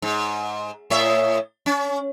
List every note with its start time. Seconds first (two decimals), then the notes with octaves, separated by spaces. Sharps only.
0.02 G#2
0.90 A2 C#5 E5
1.66 C#4